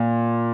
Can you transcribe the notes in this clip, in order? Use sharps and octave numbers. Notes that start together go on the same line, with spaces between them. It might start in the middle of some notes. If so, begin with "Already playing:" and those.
Already playing: A#2